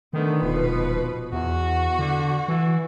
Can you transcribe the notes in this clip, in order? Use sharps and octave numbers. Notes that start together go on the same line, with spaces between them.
D3 D#3 A3 B3
D#1 B2 F3 B4
E2 F#4
D3
E3